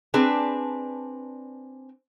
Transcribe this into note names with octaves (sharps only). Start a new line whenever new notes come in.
C4 D4 G#4 B4